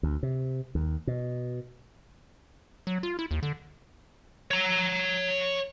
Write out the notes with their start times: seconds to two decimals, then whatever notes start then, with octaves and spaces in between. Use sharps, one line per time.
0.03 D2
0.23 C3
0.75 D#2
1.07 B2
2.87 F#3
3.03 F4
3.19 E4
3.31 D#2
3.43 D3
4.51 C#5 A#5